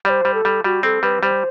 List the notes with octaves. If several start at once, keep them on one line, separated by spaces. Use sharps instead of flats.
G3 C5 D5
G3
A4
G3
G3 F#4
C4 A4
G3 B4
G3 C5